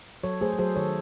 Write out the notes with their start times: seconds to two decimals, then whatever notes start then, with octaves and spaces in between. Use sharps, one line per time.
0.24 F#3 A4 C#5
0.41 A3 G#4 C5
0.52 A4
0.59 F#3 G#4 C5
0.76 D#3 A4 C#5